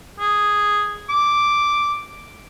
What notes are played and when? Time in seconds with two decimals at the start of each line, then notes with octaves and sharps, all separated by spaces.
0.19 G#4
1.09 D6